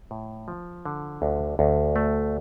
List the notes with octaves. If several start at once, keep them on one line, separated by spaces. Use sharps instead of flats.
A2
F3
D3
D2
D2
A3